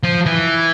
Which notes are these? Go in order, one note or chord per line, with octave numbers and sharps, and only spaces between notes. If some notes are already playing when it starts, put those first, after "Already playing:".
F3
E3